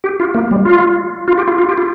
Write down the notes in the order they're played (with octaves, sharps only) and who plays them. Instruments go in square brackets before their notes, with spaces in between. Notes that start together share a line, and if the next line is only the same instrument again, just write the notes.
[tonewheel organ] G4
F4
A#3
G3
F4
F4
G4
F4
F4
G4
F4